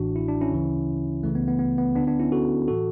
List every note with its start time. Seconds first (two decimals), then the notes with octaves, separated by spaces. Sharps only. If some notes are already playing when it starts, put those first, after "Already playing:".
Already playing: A1 A2 E3 D4 F#4
0.16 E4
0.28 D4
0.41 C#4 E4
0.52 D2 C#3 E3
1.23 C#2 C#3 E3 A3
1.35 B3
1.48 B3
1.59 B3
1.78 B3
1.95 D2 D3 B3 D4
2.07 B3 D4
2.19 C#4 E4
2.32 F#4 A4
2.68 A2 E3 F#4 A4